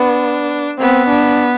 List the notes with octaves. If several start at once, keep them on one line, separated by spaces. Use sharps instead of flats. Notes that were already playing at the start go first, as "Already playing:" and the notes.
Already playing: B3 D4
B3 C4
D4